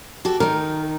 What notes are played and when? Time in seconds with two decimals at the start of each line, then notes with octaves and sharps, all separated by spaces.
0.25 F#4 G4 A4
0.40 D#3 D#4 A#4